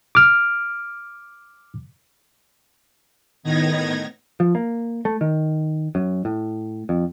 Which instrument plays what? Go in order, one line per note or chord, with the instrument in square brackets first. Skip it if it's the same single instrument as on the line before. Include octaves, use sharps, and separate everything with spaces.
[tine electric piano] D6 F6
[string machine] A2 D#3 B3 D#4 G#6 A#6
[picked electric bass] F3
A#3
A3
D#3
F#2
A2
F2